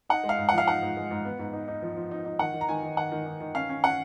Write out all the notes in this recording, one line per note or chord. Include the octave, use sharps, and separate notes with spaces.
D#4 F#5
G#3
F5
G#2
F3 F#5
F5
D#4 F#5
G#2
G#3
G#2
B3
G#2
D#4
D#4
F3
F3
D#4
D#4
D#3 F#5
D#3
A#5
D#3 G#5
D#3
D#3 F#5
D#3
D#4
D#3
C#4 F5
C#4
C#4 F#5